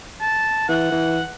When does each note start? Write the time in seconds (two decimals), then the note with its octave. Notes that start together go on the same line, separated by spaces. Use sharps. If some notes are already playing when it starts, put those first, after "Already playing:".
0.21 A5
0.69 E3 F#5
0.91 E3